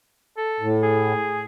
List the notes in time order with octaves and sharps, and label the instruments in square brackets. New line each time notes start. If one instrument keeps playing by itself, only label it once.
[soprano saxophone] A4
[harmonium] A2
[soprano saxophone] G#4